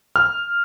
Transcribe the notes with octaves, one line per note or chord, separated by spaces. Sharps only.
F6